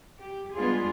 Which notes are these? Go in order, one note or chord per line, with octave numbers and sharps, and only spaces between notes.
G4
G3 G#3 B3 D4 F4 G#4